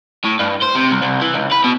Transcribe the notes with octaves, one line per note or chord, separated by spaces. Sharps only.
A2
G2
C5
C3
C2
C2
E3
C#2
B4
B2